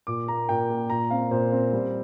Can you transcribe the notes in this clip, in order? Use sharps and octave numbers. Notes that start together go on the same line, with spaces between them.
A#2 D6
A#3 A#5
A#2 G5
A#3
A#2 A#5
C4 F5
A#2 C5
C4
G3